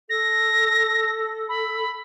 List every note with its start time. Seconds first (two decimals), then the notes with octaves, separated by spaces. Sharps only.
0.10 A4 A#6
1.49 B5